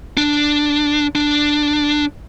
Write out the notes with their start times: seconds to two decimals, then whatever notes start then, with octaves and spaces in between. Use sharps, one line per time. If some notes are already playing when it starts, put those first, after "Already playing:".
0.17 D4
1.15 D4